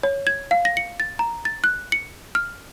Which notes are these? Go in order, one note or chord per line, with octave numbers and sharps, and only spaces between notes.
C#5
G#6
F5
A#6
C#7
A6
A#5
A6
F#6
C#7
F6